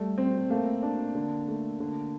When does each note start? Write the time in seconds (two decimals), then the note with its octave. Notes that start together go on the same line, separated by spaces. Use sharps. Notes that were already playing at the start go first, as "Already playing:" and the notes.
Already playing: G3 A3
0.18 C4
0.50 A3 A#3
0.83 D4
1.15 D3
1.48 A3
1.80 D3